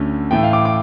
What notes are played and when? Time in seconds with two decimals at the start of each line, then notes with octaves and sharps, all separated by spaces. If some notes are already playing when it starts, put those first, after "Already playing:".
Already playing: D2 D3 A3 C#4
0.31 A2 E3 A3 G5
0.43 F5
0.53 D6
0.65 D6